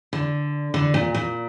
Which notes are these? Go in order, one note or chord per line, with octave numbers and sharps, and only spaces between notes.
D3
D3
A#2
A#2